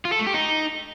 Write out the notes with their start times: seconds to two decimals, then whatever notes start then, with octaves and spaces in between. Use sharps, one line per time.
0.05 F4
0.12 A4
0.20 A3
0.27 G4
0.34 D#4